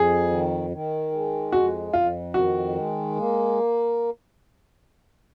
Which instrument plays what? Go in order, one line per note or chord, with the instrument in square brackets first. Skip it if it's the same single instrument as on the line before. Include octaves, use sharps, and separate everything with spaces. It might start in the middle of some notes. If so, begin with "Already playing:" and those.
Already playing: [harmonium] F2 [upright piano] G#4
[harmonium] D#3
D#3
G#3
[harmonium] F2 [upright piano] F#4
[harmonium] F2 [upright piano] F4
[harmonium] D#3 [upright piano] F#4
[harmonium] G#3
A#3